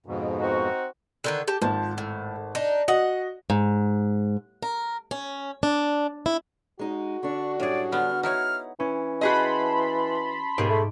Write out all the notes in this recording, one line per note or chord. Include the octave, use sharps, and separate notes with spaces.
F2 G#2 B2
C4 D#4 F#4
D3 D#3 B4
G4 A5
G#1 F3 A5
A2
D4 D#4
F#4 D#5 F#5
G#2
A#4
C#4
D4
E4
G#3 D#4 F#4
D3 D4 C#6
F#2 A2 G3 D4 G#4 D5
D3 B3 F6
D#4 E4 C#5 F#5 F6
E3 C#4
F#4 G#4 D#5 A5 B5 C6
D#2 G#2 B2 G#4 D7
A3